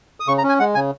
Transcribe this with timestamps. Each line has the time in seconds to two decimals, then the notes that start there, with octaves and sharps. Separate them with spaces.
0.20 D#6
0.27 C#3 C#6
0.38 A#5
0.43 C#4
0.49 G#5
0.59 G#3 F#5
0.75 C#3 G#5